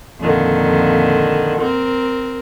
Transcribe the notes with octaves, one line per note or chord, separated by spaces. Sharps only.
F2 A#2 D3 D#3
C4 A#4